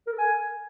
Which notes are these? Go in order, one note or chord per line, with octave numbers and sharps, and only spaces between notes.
A#4
A4
G#5